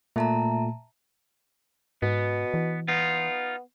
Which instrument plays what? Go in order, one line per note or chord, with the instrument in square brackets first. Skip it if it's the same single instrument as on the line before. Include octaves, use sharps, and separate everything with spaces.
[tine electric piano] A#2 A3 [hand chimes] E5 A5 A#5
[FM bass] G#2 [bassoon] B2 [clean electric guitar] B3
[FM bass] E3
[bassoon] B3 [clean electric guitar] D#4 F4